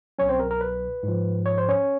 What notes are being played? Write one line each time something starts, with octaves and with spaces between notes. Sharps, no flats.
C2 B2 F#3 C#4 C#5
C4 C5
A#4
A#4
B4
G#2 F3
C#5
C5
C#4 C#5